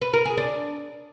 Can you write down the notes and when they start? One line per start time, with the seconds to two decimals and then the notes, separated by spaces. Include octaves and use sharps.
0.01 B4
0.13 A#4
0.25 G#4
0.37 D4